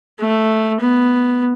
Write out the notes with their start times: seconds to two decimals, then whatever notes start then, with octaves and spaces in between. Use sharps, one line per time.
0.19 A3
0.81 B3